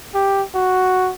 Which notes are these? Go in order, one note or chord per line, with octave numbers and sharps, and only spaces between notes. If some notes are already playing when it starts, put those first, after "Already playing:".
G4
F#4